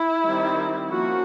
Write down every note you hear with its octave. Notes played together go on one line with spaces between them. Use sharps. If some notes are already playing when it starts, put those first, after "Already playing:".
Already playing: E4
D#3 G3 C4
F3 A#3 C#4 F#4